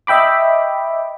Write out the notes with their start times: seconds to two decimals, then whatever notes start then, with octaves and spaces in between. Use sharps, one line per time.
0.07 D#5 E5 G5 B5 D6